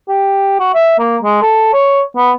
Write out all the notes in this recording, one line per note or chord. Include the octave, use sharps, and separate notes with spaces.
G4
F#4
E5
A#3
G#3
A4
C#5
B3